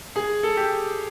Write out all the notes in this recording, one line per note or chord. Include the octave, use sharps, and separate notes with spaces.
G#4
A4
G4